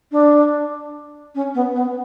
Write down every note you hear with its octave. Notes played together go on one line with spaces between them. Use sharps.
D4
C#4
B3
B3